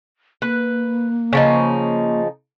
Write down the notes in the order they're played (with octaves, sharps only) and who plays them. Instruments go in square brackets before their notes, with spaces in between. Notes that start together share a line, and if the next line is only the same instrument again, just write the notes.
[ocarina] A#3 [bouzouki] B4
[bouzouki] C#3 F3 D#4